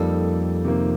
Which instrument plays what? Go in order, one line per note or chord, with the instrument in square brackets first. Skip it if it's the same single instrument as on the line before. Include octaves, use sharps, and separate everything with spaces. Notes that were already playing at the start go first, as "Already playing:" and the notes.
Already playing: [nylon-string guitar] F2 [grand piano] G3 A#3 D#4 A4
[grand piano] C3 D#3 A#3